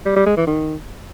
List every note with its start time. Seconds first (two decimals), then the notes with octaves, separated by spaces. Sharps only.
0.06 G3
0.16 G3
0.26 G#3
0.37 E3
0.47 D#3